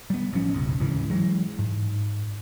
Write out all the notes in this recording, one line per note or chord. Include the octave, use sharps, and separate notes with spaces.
G3 B3
A1 F3 C#4
B1 F2 C#3
D2 G#2 C#3 E3
E3 F#3 G#3
G#2